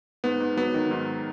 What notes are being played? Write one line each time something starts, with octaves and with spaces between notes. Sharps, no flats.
G#2 B3
G#2
F#3 B3
D#3
G#2